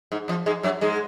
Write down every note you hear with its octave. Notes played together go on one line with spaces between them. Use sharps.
G#2
F2 F3
G#2 G#3
F#2 F#3
G#2 G#3